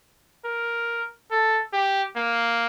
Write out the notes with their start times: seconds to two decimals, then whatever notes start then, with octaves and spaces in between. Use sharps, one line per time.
0.45 A#4
1.31 A4
1.73 G4
2.16 A#3